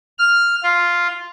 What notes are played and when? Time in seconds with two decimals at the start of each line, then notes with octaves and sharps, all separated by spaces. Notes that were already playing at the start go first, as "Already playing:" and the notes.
0.18 F6
0.63 F4